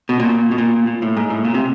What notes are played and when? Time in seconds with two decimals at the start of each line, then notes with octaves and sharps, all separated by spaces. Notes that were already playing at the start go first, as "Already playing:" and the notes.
0.09 B2
0.20 A#2
0.51 B2
0.58 A#2
0.87 A#2
1.02 A2
1.17 G#2
1.30 A2
1.45 A#2
1.54 C3